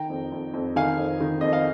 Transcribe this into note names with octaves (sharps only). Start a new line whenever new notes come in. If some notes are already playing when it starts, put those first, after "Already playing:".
Already playing: D#3 G5 A#5
F2
F2
F2
D#3 F5 G#5
F2
D#3
F2 D#5
F5